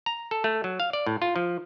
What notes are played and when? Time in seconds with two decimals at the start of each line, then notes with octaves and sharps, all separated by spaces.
0.06 A#5
0.31 A4
0.44 A3
0.64 F#3
0.80 F5
0.93 D5
1.06 A2
1.22 F4
1.36 F3